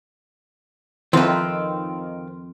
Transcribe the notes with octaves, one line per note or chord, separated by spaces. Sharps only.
F2 D#3 C4 F4 B4